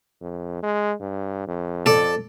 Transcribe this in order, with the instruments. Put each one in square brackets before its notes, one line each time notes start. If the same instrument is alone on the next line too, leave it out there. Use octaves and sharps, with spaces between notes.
[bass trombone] F2
G#3
G2
F2
[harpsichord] A4 D5